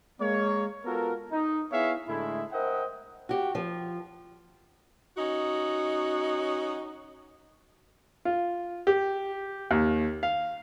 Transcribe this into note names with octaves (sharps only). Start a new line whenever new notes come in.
G#3 A#3 C#5
B3 F4 F#4 A4 A#4
D#4
B3 E4 G#4 C#5 E5 F5
A2 D3 G#3 A3 E4
A#4 C5 D#5 E5 F#5 G5
F#4 G4
F3
C#4 D#4 F#4
F4
G4
D#2
F5